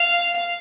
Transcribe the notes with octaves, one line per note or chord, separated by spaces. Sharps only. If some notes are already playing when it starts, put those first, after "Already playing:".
Already playing: F5